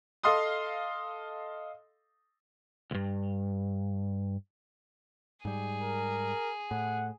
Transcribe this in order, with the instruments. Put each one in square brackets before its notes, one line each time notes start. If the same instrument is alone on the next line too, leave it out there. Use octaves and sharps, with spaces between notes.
[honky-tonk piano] A4 D#5 F5 C6 D#6
[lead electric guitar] C#2 G2
[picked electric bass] G#2 G3 [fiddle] G#4
[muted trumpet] A#4
[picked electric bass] A2 [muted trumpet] F#5